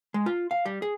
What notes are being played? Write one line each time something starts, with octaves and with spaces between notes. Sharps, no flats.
G#3
F4
F5
G3
G#4